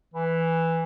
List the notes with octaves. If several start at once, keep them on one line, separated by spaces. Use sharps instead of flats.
E3